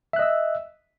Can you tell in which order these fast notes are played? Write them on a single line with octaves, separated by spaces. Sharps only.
E5 F#6 D#5 E6